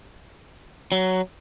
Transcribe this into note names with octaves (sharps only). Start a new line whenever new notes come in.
F#3